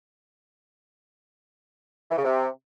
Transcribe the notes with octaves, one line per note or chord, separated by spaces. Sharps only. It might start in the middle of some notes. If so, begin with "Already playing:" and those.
E3
C#3
C3